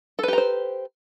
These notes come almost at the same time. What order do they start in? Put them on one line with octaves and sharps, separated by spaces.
A4 B4 G4 A#5 C5